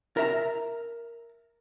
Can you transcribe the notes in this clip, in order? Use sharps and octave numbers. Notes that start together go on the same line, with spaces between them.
A#4 E5 A#5